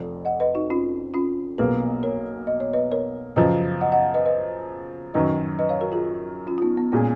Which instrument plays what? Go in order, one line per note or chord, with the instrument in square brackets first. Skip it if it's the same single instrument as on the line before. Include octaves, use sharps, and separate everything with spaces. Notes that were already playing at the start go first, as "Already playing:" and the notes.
Already playing: [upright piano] F1 F2 F3
[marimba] D#5 F#5
B4 D#5
D#4 F#4
C#4 F4
C#4 F4
[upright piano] B1 B2 A#3 [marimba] G#4 B4
[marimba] A#4 C#5
D#5
C#5
B4 D#5
A#4 C#5
[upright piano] F#2 C#3 F3 [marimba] B4 D#5
[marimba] D#5 F#5
D#5 F#5
B4 D#5
B4 D#5
[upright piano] F#2 D#3 F#3 [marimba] B4 D#5
[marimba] B4 D#5
C#5 F5
F#4 A#4
F4 G#4
C#4 F4
F4
B3 D#4
B3
[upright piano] A#2 G#3 C#4 G#4 [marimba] B3